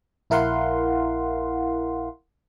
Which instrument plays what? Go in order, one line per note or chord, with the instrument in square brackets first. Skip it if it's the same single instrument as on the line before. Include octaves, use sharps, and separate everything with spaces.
[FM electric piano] A#1 E4 A#4 F5 F#5 C6